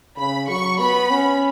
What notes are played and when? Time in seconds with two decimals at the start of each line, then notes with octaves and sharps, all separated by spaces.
0.18 C#3 B5
0.49 F#3 C#6
0.80 B3 B5
1.11 C#4